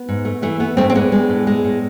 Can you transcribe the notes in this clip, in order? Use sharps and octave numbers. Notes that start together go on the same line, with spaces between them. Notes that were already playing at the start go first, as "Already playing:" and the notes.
Already playing: B3
G#2
A3
E3 A3
A3 B3
G#2 A3 C4
C4
G#3 B3 D4
G#3
A2
G#3
A2